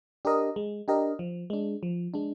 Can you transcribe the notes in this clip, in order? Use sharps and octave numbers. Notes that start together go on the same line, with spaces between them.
D4 G4 A#4 D#5
G#3
D4 G4 A#4 D#5
F3
G#3 D4
F3
G#3 D4